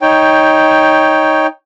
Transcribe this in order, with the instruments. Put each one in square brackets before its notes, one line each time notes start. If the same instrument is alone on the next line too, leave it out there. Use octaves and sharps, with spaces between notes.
[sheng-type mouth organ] D#4 C#5 G5